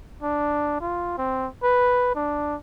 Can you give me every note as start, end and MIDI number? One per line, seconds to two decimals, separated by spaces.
0.23 0.77 62
0.81 1.15 65
1.18 1.48 60
1.63 2.11 71
2.15 2.56 62